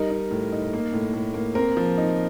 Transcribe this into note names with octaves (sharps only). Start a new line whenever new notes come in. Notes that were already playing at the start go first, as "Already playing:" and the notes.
Already playing: G3 D#4 A#4
D#4
A2
D#4
A#3
A2
A2
A#3
C4 A#4
F3
D#4